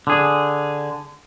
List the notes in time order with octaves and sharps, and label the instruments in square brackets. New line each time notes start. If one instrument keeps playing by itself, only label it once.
[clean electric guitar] D3 G#4